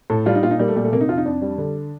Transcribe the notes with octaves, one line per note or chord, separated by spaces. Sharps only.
A2 A4
G3 F4
D#4
A#2 F4
D#4
G3 A#3
A3
A#2 G3
A3
C3 A#3
D#4
F2 F4
D#4
F2 D4
G3
D3